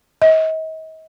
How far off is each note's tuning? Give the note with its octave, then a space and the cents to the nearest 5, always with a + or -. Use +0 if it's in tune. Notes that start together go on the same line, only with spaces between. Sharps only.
D#5 +40